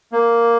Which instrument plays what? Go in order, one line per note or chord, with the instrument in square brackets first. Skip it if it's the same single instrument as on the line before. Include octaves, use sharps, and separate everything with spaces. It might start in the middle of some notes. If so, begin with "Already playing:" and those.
[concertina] A#3